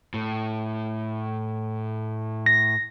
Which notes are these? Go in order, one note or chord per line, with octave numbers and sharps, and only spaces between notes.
A2
A#6